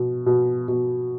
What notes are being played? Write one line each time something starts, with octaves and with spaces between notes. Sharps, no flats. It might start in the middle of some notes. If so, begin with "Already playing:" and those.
Already playing: B2
B2
B2